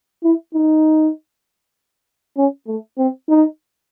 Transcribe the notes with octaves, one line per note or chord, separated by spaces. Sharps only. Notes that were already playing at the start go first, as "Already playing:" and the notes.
E4
D#4
C#4
A3
C4
D#4